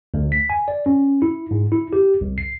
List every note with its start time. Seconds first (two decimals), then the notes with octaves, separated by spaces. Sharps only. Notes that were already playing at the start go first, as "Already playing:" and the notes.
0.14 D2
0.32 B6
0.50 G#5
0.68 D5
0.86 C#4
1.22 E4
1.51 G#2
1.72 E4
1.93 G4
2.21 C2
2.38 C7